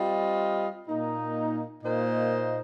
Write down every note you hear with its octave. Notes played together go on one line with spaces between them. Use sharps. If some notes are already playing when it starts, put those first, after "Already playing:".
Already playing: G3 C4 F4 D#5
A#2 A#3 D#4
A#2 A#3 D#4 C5 D#5